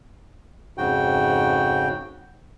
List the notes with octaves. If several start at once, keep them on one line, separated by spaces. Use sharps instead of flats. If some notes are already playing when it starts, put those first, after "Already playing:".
F2 G#2 C#3 F#4 G5